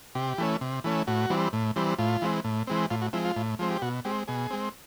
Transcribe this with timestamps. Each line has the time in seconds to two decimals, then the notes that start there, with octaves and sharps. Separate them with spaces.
0.15 C3 G4
0.38 E3 A3 C#4
0.61 C3
0.84 E3 A3 C#4
1.07 A2 F#4
1.30 E3 G3 C4
1.53 A2
1.76 E3 G3 C4
1.99 A2 F4
2.22 E3 G#3 C4
2.44 A2
2.67 E3 G#3 C4
2.90 A2 F4
3.02 F#4
3.13 F3 G#3 C4 E4
3.25 F4
3.36 A2
3.59 F3 G#3 C4
3.71 G4
3.82 B2 F#4
4.05 G#3 C4 G4
4.28 B2 G#4
4.51 G#3 C4